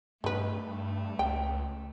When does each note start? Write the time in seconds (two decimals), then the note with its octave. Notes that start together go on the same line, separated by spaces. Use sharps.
0.24 G2 D#3 A3 B4
1.19 C#2 G5